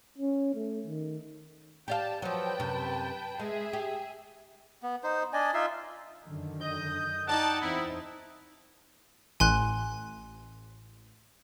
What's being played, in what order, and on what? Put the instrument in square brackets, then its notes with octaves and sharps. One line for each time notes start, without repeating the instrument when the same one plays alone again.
[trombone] C#4
A3
D#3
[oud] G4 D5 F5 [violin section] G5 A5
[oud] F3 F#3 [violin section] B4 G5 A5
[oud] F#2 C3
[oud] G#3 [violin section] G#4 E5
[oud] G4
[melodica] B3
D#4 C5
D4 D5 D#5 G#5
D#4 F4 E5 C6
[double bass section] F#2 D3 D#3
[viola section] D#5 [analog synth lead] G6
[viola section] D#4 [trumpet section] D5 G5 A5 [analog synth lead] F#5
[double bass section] E2 C4 [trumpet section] E4
[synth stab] A1 [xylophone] G#5 C6 F#6